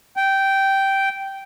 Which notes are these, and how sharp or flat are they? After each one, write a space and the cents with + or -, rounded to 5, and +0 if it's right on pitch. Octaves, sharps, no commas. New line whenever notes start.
G5 -10